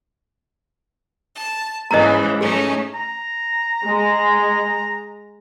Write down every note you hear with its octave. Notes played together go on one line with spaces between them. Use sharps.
A5
G#2 C#3 E3 D#5 A#5
A3 C#4 D#4 G#4
A#5
G#3